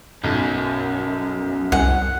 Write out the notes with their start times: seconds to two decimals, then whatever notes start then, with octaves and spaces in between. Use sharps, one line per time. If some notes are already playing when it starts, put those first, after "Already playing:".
0.24 B1 F#2
1.72 C2 F#5 G#5 F#6